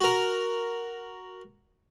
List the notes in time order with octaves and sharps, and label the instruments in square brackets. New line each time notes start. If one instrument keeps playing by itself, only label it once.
[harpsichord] F#4 A#4